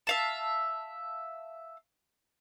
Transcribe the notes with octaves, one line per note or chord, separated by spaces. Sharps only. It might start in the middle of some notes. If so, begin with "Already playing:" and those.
E5 F5 A5